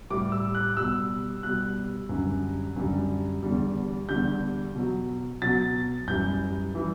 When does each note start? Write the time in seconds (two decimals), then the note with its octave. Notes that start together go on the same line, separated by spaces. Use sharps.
0.10 A2 G3 D6
0.32 E6
0.55 F#6
0.77 B2 G3 E6
1.43 B2 G3 F#6
2.09 F#2 D3 G3
2.76 F#2 D3 G3
3.43 E2 D3 G3
4.09 E2 D3 G3 G6
4.75 B2 F#3
5.42 B2 F#3 A6
6.07 F#2 E3 G3 G6
6.75 E3 G3